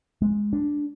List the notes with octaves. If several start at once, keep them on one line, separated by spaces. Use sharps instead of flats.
G#3
D4